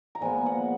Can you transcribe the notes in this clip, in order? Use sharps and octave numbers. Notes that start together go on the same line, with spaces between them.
A#5
A#2 F3 G#3 B3 G#5
F#5